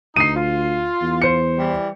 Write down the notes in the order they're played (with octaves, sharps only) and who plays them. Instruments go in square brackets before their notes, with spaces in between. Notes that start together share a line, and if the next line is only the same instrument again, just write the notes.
[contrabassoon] D2 [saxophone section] D#4 [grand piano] C7 D#7
[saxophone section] F4
[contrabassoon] E2
[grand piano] C5 C#7
[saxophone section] E3 G3